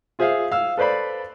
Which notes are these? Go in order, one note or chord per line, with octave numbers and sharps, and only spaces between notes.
F4 G#4 C5 E5 F5
F5 E6
A4 B4 C5 D5 B5